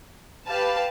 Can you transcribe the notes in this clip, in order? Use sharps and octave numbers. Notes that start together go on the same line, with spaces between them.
G4 B4 F5 A5